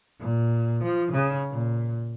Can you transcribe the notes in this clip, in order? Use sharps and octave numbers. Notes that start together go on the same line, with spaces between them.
A#2
F3
C#3
A#2